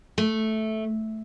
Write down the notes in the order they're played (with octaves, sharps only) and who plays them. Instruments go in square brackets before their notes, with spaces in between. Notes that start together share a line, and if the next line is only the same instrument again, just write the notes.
[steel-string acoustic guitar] A3